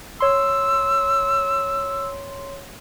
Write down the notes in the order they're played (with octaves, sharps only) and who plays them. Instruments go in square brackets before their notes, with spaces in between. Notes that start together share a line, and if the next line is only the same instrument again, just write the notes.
[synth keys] C#5 C6 [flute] E6